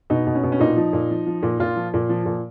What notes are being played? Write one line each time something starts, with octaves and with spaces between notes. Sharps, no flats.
B2 D#4
B2
C#4
B2
C#4
A#2 D#4
F3
A#2
F3
F3
A#2
A#2 F4
F3
A#2
F3
A#2